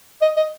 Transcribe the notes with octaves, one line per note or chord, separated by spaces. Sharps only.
D#5
D#5